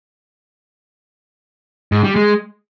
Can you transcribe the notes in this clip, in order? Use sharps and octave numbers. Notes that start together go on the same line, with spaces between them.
G#2
G3
G#3